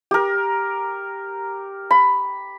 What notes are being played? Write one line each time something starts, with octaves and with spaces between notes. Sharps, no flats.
G4 A#4
B5